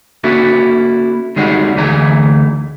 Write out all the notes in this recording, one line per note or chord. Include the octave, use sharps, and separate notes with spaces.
A#3 C#4 E4 F#4 A4
D#3 G3 G#3 C#4 F#4
D2 E3 A3 G#4 A#5